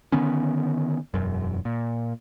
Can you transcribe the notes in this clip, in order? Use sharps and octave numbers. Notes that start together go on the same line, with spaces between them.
D3 D#3 B3 C#4
E1 F#2
A#2